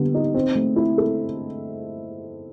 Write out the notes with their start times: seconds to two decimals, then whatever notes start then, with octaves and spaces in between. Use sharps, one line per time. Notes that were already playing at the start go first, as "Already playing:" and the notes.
Already playing: D3 G3 B3
0.15 D#4
0.35 C4
0.55 A3
0.76 E4
0.98 A4